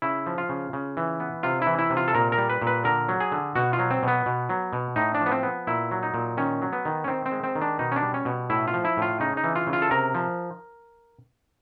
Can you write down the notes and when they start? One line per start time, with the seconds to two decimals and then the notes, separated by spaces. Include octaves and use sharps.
0.02 C#3 E4
0.26 F3
0.38 F4
0.49 C#3
0.73 C#3
0.97 E3
1.20 B3
1.43 C3 F4
1.62 E3 E4
1.79 E4
1.90 C3
1.97 F4
2.08 A4
2.14 A#2 A#4
2.32 A#4
2.38 G3
2.50 B4
2.62 A#2
2.67 B4
2.84 D3 A#4
3.08 F#3
3.20 G#4
3.32 D3
3.56 B2 F#4
3.73 F4
3.79 F#3
3.91 C4
4.03 B2 B3
4.26 B2
4.49 F#3
4.73 B2
4.96 A2 D#4
5.14 D4
5.21 F3
5.26 B3
5.32 C4
5.43 B3
5.67 A#2 E4
5.91 F#3
6.03 D#4
6.14 A#2
6.37 D#3 C#4
6.62 F#3
6.73 B3
6.85 D#3
7.04 C#4
7.08 D#3 C4
7.26 C4
7.32 G#3
7.44 C4
7.55 D#3
7.61 D4
7.79 B2 D#4
7.92 C#4
7.96 D4
8.03 G3
8.14 C#4
8.25 B2
8.50 A2 E4
8.68 F4
8.74 F3
8.85 E4
8.97 A2 F4
9.20 C#3 D#4
9.37 D#4
9.44 E3
9.56 F4
9.67 C#3
9.73 F4
9.82 A4
9.91 C3 A#4
10.14 F3